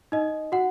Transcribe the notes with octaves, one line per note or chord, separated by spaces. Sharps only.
D#4 D#5
F#4 F#5